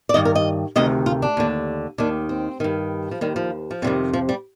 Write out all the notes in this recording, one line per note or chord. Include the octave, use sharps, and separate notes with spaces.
D5
G2 D#3 D#5
A#4
D#5
D2 C3 D#3 D#5
F4
D4
D#2 D3
D#2 D#3 D4
C4
G2 D#3
F3
D#2 D#3 G3
F3
F3
F2 C3 D#3 G3
F3
G3